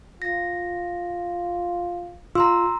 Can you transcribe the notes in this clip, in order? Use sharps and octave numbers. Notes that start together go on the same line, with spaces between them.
F4 A#6
F4 A#5 C6 E6